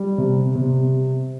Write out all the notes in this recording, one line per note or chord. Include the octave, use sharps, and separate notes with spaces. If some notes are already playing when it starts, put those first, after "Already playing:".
Already playing: G3
C3
C3